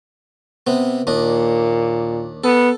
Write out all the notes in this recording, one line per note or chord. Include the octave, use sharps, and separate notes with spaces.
C3 B3
D#2 A#2 D4 D#5
B3 A4